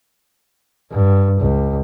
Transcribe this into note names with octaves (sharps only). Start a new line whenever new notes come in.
G2
C#2